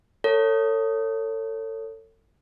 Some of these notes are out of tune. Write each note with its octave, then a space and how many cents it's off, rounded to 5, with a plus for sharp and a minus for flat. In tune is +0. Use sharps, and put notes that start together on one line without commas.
A4 +30 C#5 +0